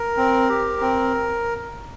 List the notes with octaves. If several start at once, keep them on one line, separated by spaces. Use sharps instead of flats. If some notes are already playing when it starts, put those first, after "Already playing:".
Already playing: A#4
C4
G4
C4